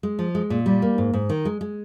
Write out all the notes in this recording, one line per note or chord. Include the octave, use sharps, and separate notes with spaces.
G#3
F3
G#3
A#2
G3
A#3
G#2
G#2
D#3
G#3
G#3